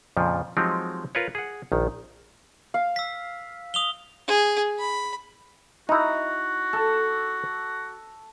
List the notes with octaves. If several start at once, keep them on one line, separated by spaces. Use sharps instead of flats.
F2 A#2 C#3 F3
F3 F#3 G#3 C4 D#4 G4
F4 A#4 B4 C#5
G#4 F#5
A#1 D#3
F5
E6 B6
D#6 F7 G7
G#4
B5
D#4 E4 F#4 A#5
A4